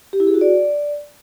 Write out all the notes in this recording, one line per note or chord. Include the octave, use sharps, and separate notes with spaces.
G4
E4
G#4
F#4
D5